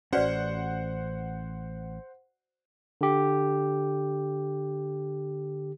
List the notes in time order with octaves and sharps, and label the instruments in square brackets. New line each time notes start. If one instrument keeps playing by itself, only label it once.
[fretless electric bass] A1 C#4 [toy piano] F#4 B4 D5 [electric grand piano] C5 F#5
[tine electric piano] D3 G4